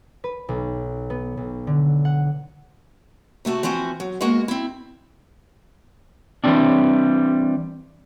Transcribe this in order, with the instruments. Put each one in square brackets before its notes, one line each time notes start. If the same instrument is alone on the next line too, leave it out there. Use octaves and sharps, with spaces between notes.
[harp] B4
B1
B3
B1
D3
F#5
[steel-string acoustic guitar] C3 A3 F#4 A5
E3 F3 C4 F#4
F#3
G#3 A#3 B3 F#4 A#4
C4 E4
[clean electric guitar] E3 F3 G3 C4 D4